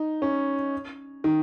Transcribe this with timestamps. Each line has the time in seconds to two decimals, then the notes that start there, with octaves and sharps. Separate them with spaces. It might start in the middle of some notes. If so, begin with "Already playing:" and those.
Already playing: D#4
0.22 C#4
1.24 D#3